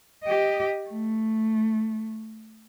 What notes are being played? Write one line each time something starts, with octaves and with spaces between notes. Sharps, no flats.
G4 D#5
A3